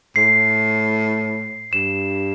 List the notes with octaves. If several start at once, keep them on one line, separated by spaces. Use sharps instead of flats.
A2 C7
G2 E7